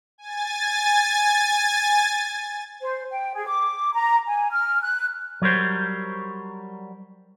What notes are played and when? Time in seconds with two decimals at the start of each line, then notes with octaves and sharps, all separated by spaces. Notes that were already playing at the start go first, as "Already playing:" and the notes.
0.18 G#5 A6
2.81 C5
3.11 G5
3.34 G#4
3.47 D6
3.94 A#5
4.27 G#5
4.51 F6
4.81 F#6
5.42 F#3 G3 A#4 C5